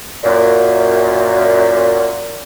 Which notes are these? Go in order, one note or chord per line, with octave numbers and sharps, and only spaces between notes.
F#2 A#2